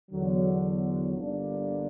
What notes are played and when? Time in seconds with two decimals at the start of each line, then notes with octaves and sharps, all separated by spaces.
0.11 E2 D3 F#3
1.16 G1 G2 D3 A#3 D4